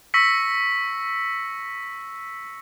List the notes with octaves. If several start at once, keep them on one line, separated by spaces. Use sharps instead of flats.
C#6 E6 A#6 B6 C#7